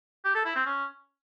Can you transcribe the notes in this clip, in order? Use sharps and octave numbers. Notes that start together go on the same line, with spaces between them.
G4
A4
E4
C4
C#4